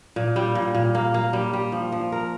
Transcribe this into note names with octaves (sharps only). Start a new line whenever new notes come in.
A#2
G3
A#2
A#2
A#3
A#3
G3
G3
F3
F3
A#4